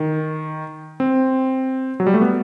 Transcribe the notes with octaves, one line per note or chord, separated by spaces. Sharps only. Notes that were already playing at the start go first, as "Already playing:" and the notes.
Already playing: D#3
C4
F#3
G3
A3
B3